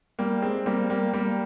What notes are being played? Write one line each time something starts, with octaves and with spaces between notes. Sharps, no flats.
G3 A#3
G#3 C4
G3 A#3
G3 A#3
G3 A#3